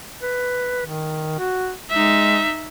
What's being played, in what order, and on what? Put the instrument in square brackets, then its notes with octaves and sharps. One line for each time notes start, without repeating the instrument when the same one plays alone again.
[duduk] B4
D#3
F#4
[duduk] G#3 [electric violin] D#4 E5